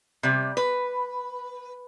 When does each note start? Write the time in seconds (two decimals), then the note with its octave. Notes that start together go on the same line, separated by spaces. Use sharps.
0.23 C3 G3
0.57 B4